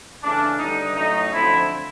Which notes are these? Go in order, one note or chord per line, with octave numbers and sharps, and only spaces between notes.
C#3 E3 A3 C#4 D4
D3 G3 B3 D#4
A2 F#3 A3 C#4 D#4
D3 F3 A3 C4 E4